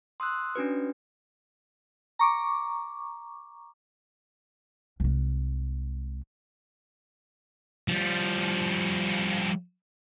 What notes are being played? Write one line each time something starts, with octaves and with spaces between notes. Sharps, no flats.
C6 D#6 E6 F#6
C#4 D4 F#4 B4
A#5 C#6 D6
C2 G#3
F3 G3